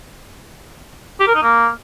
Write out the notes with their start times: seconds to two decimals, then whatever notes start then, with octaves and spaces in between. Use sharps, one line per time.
1.20 G4
1.28 A#4
1.35 D#4
1.43 A#3